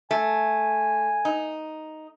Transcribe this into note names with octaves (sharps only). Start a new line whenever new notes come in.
A3 G#5
D#4